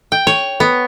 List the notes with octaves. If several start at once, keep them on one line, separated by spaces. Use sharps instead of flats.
G5
C#5
B3